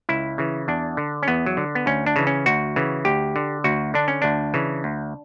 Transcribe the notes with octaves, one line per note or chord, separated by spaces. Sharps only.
C#2 E4
C#3 E3
E2 D4
D3
C#4
E2 B3
F#3
D3
B3
D2 C#4
D4
C#3 E3
C#4
D2 F#4
C#3 E3
D2 G4
D3
D2 F#4
D3 D4
C#4
D2 D4
C#3 E3
D2